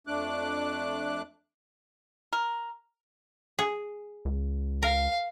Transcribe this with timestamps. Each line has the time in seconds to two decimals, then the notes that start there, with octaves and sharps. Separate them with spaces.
0.07 F2 A3 D4 D6 F#6
2.33 A#4
3.59 G#4
4.25 C#2
4.83 A#4 F5